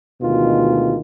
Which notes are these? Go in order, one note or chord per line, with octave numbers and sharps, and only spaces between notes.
D2 B2 D#3 G#3 F4